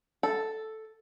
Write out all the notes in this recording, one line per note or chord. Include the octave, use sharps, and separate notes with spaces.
A4